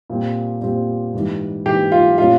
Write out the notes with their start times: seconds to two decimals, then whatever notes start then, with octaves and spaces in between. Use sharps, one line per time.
0.10 A#2 G3 C4 G4
0.61 A#2 G3 C4 G4
1.14 G#2 E3 G3
1.66 G#2 E3 G3 G4
1.92 F4
2.18 A#2 G3 C#4 F4